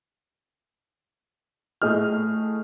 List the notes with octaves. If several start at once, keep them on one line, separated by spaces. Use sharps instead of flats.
A2 A3 G#4 D#5 F6